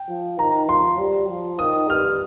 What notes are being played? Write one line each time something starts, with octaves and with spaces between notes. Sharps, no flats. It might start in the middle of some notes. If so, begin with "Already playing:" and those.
Already playing: G5
F3
D#3 A#5
F3 C6
G3
F3
D#3 D#6
G2 F6